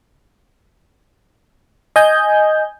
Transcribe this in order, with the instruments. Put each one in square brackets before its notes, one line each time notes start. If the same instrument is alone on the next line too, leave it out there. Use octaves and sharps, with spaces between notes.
[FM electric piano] D#5 G#5 G6